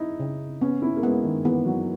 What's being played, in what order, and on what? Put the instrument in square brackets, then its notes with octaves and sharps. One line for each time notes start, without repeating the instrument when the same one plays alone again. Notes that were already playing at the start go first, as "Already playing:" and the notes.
Already playing: [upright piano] D#4 E4
[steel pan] C#3
[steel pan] B3 [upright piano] C#4
[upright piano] E4
A#3
[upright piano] G#3 [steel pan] B3
[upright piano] D#3
[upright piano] E3 [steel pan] B3
[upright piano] F#3